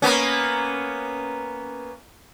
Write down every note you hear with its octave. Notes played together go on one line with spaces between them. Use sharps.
A#3 B3 C#4